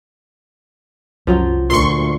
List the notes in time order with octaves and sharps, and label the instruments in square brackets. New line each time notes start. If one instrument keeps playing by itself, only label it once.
[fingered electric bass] C2 C#4 [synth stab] F#2 [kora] F3 F#3 F4
[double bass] D2 [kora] A#2 [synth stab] C6 C#6